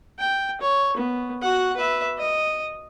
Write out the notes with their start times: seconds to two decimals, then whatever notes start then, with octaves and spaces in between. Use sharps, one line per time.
0.19 G5
0.61 C#5
0.97 B3
1.42 F#4 F#5
1.77 B4 E5
2.18 D#5